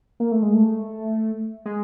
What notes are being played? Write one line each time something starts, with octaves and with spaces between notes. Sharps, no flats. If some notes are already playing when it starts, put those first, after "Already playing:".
A#3
A3
G#3
A3
G#3